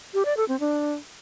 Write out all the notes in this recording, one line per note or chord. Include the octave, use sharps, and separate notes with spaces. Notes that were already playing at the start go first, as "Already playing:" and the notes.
G4
D5
A4
C4
D4